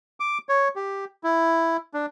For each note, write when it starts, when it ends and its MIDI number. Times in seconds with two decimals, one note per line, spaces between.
0.20 0.38 86
0.49 0.68 73
0.76 1.05 67
1.23 1.77 64
1.94 2.06 62